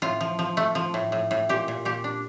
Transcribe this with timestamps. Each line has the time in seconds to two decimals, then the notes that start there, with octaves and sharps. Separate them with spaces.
0.02 A2 F4
0.21 F3
0.39 F3
0.57 A3
0.75 F3
0.94 A2
1.12 A2
1.31 A2
1.49 A#2 G4
1.68 A#2
1.85 A#2 G4
2.04 D4